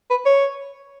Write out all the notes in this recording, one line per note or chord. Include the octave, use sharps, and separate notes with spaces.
B4
C#5